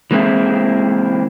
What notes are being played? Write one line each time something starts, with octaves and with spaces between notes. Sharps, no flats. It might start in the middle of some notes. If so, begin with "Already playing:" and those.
E3 G#3 A#3 C4 E4